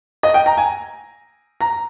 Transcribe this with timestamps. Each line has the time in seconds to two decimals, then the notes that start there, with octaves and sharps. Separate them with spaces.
0.23 D#5
0.34 G5
0.46 A#5
0.58 G#5
1.61 A#5